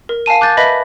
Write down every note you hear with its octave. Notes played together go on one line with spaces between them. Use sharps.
A#4
F5 G#5 A5 D#7
D6 F#6 G6 A6
B4 D#5 E5 B5 A#6 B6